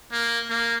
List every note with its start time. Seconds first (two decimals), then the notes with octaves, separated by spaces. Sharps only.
0.12 A#3
0.50 A#3